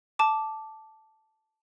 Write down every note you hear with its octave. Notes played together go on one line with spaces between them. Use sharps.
A5 D6